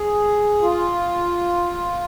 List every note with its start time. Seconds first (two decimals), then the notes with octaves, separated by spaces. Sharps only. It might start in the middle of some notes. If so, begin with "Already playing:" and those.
Already playing: G#4
0.62 F4